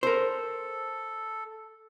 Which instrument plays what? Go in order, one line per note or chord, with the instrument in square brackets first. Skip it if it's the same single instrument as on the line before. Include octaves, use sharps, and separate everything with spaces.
[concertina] A4 [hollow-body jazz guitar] A#4 C5